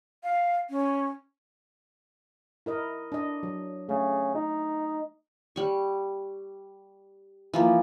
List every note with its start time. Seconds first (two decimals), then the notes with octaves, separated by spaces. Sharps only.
0.24 F5
0.70 C#4
2.66 E4 A#4 D#5
3.12 D4 D#5
3.43 F#3
3.89 C#3 A3
4.35 D#4
5.56 G3 C#6
7.54 E3 F3 A#3